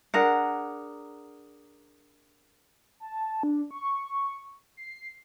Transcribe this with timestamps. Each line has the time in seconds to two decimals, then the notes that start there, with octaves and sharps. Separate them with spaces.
0.14 D4 G#4 A#4 F#5
3.00 A5
3.43 D4
3.71 C#6
4.77 C7